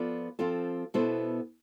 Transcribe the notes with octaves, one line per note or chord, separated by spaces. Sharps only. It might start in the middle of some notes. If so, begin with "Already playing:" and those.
Already playing: F3 B3 F4 A4 D5
F3 C4 F4 A4
B2 B3 E4 A4 C5